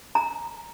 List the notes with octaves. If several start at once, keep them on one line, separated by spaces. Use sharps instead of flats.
A#5